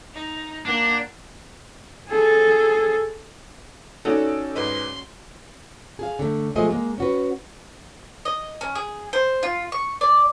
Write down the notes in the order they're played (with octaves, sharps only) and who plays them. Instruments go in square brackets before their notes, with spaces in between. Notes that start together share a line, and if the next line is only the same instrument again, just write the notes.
[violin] D#4
[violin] A#3 F#5 [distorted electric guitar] D4
[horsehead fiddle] G#4 A4
[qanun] C#4 F#4 [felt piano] D#4 D5 [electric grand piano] A4
[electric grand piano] G#2 B4 D#5 [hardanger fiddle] C6
[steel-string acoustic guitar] G#4 F5
D3 A3
B2 F3 G#3 A3 G#4 D#5
G#3 A#3
C#4 F#4 B4
[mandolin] D#5
C#4
G#4
C5
F4
C#6
D5